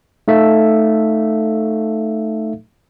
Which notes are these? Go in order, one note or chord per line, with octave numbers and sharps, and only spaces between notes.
A3 D#4 A4 E5 F5